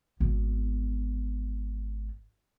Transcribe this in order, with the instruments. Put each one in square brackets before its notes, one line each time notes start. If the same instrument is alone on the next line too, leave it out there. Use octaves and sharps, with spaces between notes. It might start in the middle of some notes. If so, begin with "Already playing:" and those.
[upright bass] G#1 B3